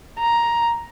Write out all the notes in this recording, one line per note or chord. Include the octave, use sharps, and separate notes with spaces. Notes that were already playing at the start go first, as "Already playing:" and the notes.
A#5